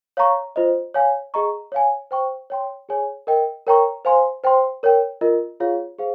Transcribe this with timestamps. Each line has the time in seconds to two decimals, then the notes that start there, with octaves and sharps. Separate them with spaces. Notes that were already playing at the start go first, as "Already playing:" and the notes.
0.17 C#5 F5 A#5 C#6
0.56 F4 C5 D#5
0.94 C#5 F5 G#5
1.34 G#4 D#5 A#5 C#6
1.72 C#5 F5 G#5
2.11 C5 G5 C#6
2.50 C#5 G5 C6
2.89 G#4 C#5 G#5
3.27 A#4 D#5 G5
3.67 A#4 C#5 G5 A#5 C#6
4.05 C5 F5 G#5 C6
4.44 C5 G5 C6
4.83 A#4 C#5 G5
5.21 F4 A#4 D#5
5.60 F4 G#4 C#5 F5
5.98 G#4 C5 F5